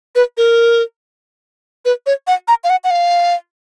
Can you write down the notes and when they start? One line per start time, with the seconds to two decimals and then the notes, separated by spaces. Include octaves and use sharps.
0.16 B4
0.37 A#4
1.85 B4
2.06 C#5
2.27 F#5
2.48 A#5
2.64 F5
2.70 F#5
2.84 F#5
2.91 F5